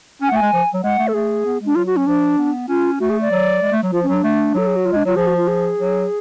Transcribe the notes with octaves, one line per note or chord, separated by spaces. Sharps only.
C#4 G#5
F#5
A3
G#5
G#3
F3
F#3
G#3 F#5
A3
A4
A3 G#4
B3
G#3
D4
F#3 F4
F#4
C#4
F3 D4
B3
C#4 F4
A3 F#4
G#4
D5
F#3
G#3
A3
F#3
F3 F4
C#4
F#3 D4
A3
F#3 A4
G#4
F#4
F4
G#3 D4
F#3 F4
F3 G#4
F#4
F4
G#4
F#3